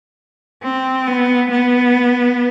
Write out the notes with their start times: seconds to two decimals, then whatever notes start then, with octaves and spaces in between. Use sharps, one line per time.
0.63 C4
1.07 B3
1.50 B3